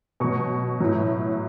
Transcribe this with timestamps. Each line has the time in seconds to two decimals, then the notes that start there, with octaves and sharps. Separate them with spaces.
0.20 B2 F#3 C#6
0.80 A2 F#3